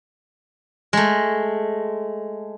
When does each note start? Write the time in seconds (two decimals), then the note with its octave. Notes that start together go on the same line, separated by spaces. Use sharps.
0.93 G#3 A3